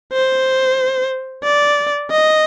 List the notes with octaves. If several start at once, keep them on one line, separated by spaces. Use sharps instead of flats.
C5
D5
D#5